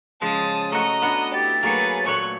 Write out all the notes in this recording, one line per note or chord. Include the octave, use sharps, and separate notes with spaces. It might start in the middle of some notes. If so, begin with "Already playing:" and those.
C#3 F3 G#3 A5 D#6
A3 F#4 D#5 A#5
B3 D4 F#5
E4 G4 A6
F#3 A3 A#3 G#4 B4
A#2 A3 C#5 C#6 F#6